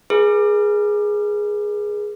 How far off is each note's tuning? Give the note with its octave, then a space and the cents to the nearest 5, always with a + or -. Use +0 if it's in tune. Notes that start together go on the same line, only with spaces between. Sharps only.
G#4 +0 B4 -45